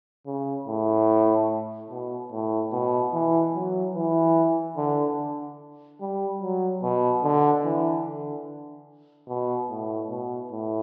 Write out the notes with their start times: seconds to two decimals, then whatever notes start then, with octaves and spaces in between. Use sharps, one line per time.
0.26 C#3
0.67 A2
1.90 B2
2.32 A2
2.72 B2
3.13 E3
3.55 F#3
3.95 E3
4.77 D3
6.01 G3
6.42 F#3
6.83 B2
7.23 D3
7.64 E3
8.06 D3
9.28 B2
9.69 A2
10.11 B2
10.52 A2